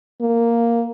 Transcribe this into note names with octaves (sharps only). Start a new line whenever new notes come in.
A#3